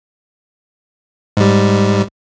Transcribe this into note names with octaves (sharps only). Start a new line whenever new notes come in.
G#2 G3